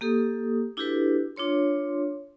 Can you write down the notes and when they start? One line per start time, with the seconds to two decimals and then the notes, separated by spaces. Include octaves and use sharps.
0.01 A#3 G4 A4 D#6
0.77 D4 E4 F#4 G4 A4 B4
1.36 D4 F4 C#5 C6